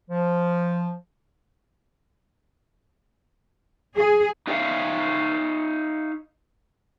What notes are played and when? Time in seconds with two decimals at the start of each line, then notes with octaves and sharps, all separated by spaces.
0.10 F3
3.96 G#4
4.47 D#4 G4 G#4 C#5 E5 F5